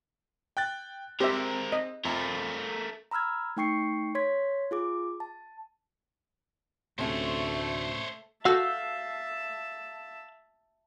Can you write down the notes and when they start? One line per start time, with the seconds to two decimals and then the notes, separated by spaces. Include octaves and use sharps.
0.57 G5 F#6 A6
1.20 G#3 C4 G4 A#4 C5 E5
1.72 D#5
2.05 F2 A3 A#4
3.11 A#5 B5 E6 F6 G#6
3.57 A3 D#4 G5 C#6 C7 C#7
4.15 C#5 C6 G#6 B6
4.71 F4 G#4 D6
5.20 A5
6.99 D2 A2 C3 A3 C#4 C5 C#5
8.45 F#4 A4 E5 F5 A5 E6 G6